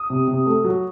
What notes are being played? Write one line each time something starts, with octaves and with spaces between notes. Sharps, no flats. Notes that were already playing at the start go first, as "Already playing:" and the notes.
Already playing: D#6
C3
C3
A3
F#3